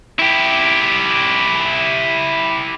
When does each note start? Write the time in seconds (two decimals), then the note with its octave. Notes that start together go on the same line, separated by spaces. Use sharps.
0.19 E4 G4